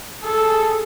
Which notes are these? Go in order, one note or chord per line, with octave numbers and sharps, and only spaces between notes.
G#4 A4